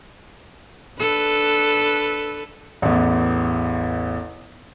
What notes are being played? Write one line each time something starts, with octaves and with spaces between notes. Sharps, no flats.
D4 A4 B4
A1 E2